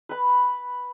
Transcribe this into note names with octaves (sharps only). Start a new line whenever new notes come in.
B4 B5